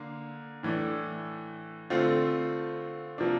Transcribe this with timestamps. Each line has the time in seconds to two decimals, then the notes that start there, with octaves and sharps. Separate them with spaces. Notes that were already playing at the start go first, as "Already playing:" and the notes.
Already playing: D3 A#3
0.63 A2 E3 A3 D4
1.90 D3 A3 C4 F4
3.18 C3 F3 A#3 D4